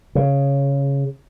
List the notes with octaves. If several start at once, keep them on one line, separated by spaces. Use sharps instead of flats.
C#3